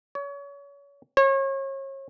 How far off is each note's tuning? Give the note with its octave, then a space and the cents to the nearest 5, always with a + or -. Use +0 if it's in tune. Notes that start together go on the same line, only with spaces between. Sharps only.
C#5 +30
C#5 -35